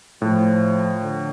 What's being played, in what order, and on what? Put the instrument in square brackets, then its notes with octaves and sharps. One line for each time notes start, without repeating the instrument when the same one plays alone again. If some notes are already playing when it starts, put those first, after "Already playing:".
[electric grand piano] A2 [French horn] F3
[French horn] D3